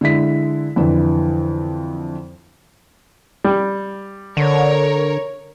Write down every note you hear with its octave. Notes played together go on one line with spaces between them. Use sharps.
D3 G#3 E4 B6
F2 D3 E3
G3
D3 A#4 C#5